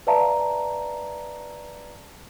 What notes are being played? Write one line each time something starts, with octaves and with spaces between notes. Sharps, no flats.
B4 D5 E5 F5 A5 A#5